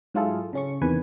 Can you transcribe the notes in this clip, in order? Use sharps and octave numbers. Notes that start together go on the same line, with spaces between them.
G#2 F#3 E4 F4 G#4 A4
C#3 C#4 C#6
E2 C3 D#3 B4 G#5